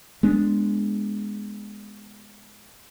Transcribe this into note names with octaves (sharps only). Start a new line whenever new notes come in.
G#3 B3 D4